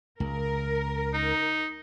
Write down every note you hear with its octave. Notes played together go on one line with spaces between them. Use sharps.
C#2 A#4
D#4